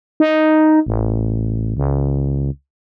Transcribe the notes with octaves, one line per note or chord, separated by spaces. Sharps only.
D#4
A1
C#2